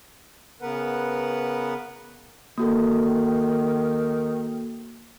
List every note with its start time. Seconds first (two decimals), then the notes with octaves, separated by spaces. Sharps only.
0.62 C#3 B3 A#4 B4 F#5
2.58 D#3 A#3 F#4 A4